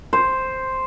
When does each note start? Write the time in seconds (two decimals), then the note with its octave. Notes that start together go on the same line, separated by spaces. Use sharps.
0.13 C5